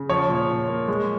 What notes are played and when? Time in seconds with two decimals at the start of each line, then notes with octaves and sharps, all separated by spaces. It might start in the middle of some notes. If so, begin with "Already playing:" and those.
Already playing: C#3
0.09 F3 C#5
0.29 A#2
0.49 A#2
0.69 A#3
0.88 G#3